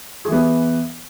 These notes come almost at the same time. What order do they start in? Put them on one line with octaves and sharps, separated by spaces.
G#4 E3 B3